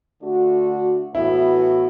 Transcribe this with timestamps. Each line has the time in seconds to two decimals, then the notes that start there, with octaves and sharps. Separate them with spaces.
0.21 D3 A3 D4 F#4
1.15 A2 E3 B3 E4 F#4